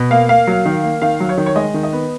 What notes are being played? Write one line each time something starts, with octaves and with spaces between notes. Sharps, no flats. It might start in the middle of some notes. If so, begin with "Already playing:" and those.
Already playing: B2
A#3 F5
A#3 F5
F#3
D#3
A#3
D#3 F5
F#3
C#5
D#3
C#5
G#3 D#5
D#3
D#5
B3